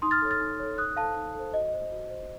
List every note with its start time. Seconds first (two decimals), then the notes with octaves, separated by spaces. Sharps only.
0.02 D#4 C6 D#6
0.11 F6 A6
0.22 A4 C#5
0.31 F6 A6
0.40 D#4
0.60 A4 C#5
0.78 D#4 D#6 F#6
0.97 A4 C5 F5 A5
1.16 D#4
1.34 A4 C5
1.54 F#4 D#5
1.74 C5
1.91 F#4
2.10 C5